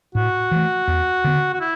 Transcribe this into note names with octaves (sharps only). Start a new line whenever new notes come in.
A2 F#4
E3 A3
E2
D3 B3
F#4
E4